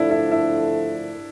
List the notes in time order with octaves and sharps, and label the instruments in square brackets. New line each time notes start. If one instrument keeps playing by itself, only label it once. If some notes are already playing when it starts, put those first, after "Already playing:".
Already playing: [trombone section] D3 F3 A3 [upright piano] D4 E4
[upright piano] E4
E4